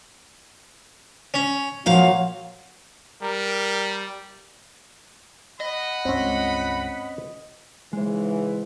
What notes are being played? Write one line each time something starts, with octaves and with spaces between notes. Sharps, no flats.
C#4
A#2 F3 F#3 F#4 F5
G3 A#4
D#5 F#5 B5
C#2 G2 C4 C#4
G#2 C#3 E3 G#3 C5